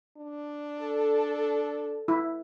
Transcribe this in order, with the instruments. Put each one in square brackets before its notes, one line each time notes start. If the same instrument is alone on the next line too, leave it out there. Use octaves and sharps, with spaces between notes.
[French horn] D4
[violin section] A4
[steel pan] E4